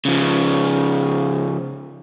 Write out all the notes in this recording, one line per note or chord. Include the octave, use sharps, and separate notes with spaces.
C#3 F3